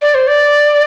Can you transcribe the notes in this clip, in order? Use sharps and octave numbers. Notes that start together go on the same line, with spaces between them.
D5
C5
D5